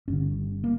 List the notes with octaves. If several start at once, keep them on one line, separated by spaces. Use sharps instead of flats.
G1 G2 D3 C#4
A#3